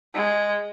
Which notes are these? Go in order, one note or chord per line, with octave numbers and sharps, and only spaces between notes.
G#3